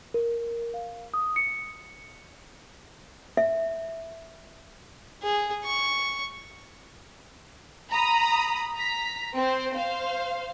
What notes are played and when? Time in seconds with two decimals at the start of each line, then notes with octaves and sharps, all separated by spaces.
0.14 A#4
0.74 F5
1.14 D#6
1.36 C#7
3.37 E5
5.23 G#4
5.65 C#6
7.90 A#5 B5 D#6
8.76 A#5 B6
9.35 C4 C5
9.72 C5 F5